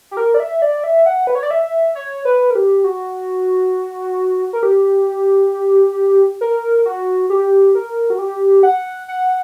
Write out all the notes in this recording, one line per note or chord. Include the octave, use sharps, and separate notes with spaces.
G4
A#4
D5
E5
D5
E5
F#5
B4
C#5
D5
E5
C#5
B4
A#4
G4
F#4
A#4
G4
A#4
F#4
G4
A#4
F#4
G4
F#5
F#5